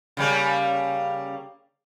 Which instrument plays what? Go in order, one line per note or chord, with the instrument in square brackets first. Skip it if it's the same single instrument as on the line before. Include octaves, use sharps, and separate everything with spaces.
[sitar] C#3 G3 A#3